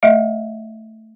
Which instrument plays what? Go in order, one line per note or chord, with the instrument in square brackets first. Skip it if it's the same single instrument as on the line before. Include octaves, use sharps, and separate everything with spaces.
[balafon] A3 D#5 E5